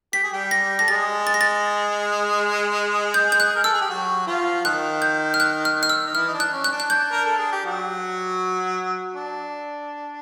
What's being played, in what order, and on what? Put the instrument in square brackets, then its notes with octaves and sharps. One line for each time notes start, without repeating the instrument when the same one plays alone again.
[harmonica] G4 [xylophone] B6
[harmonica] G#4
G3 G4
[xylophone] A#6
[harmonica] A4 [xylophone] A#6
[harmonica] G#3 G#4 [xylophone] A6
[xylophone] A6
A#6
A6
G6
G6
F#6
[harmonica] A#4
[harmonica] A4 [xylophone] E6
[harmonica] G#4
G4
F#3 F#4
F3 F4
[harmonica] D#3 D#4 [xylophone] F#6
[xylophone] G6
F6
F#6
F6
F6
E6
[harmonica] D#4
[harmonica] E3 E4 [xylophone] F6
[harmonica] D#4
D4
[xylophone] F#6
[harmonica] C#4
[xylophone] F#6
[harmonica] D4
[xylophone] F#6
[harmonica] D4 [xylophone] G6
[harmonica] A#4
A4
G#4
G4
F#3 F#4
D4